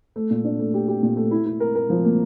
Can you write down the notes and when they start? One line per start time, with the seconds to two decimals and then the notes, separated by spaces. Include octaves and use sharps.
0.16 A3
0.31 A#2
0.44 D4
0.59 A3
0.74 G4
0.88 G4
1.03 A#2
1.17 A3
1.31 E4
1.46 E4
1.60 A#4
1.75 A#4
1.90 F3
2.05 A#3